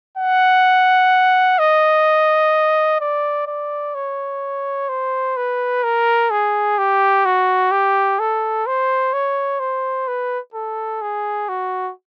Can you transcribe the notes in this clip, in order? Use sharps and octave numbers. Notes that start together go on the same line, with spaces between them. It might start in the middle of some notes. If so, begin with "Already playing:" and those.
F#5
D#5
D5
D5
C#5
C5
B4
A#4
G#4
G4
F#4
G4
A4
C5
C#5
C5
B4
A4
G#4
F#4